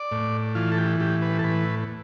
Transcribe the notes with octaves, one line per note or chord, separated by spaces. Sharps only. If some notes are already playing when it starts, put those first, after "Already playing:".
Already playing: D5
A2
E3 F4
A4
G4
A2 G4
B4
A4
A2 B4